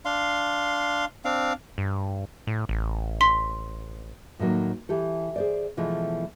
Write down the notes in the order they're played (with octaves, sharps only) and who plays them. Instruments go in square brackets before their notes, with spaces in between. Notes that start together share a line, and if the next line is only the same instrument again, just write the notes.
[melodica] D4 F5 C6
C4 D4 F5
[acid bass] G2
A2
A1
[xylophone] C6 B6
[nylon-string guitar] A2 D#3 F#3 A#3
E3 G4 A4
G#4 C5 D5
B2 E3 F3 G#3 A3